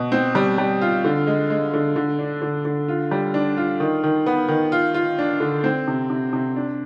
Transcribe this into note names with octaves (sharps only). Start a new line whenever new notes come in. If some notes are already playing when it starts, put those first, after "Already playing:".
Already playing: B2
C4
G3
G3
F4
D3
G#3
G#3
D3
D3
D4
D3
D3
F4
G3
D4
F4
D#3
D#3
B3
D#3
F4
F4
D4
D3
C4
C3
C3
C3
D4